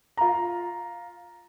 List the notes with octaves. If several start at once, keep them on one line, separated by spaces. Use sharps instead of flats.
F4 A#5